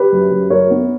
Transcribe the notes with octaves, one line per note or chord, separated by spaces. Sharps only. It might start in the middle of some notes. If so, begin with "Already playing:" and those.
Already playing: G4 B4
F#2
F#2
F#2 A#4 C#5
B3